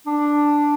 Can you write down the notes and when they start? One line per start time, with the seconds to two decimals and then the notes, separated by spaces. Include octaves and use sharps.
0.07 D4